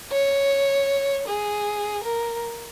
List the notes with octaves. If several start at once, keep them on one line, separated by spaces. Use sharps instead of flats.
C#5
G#4
A#4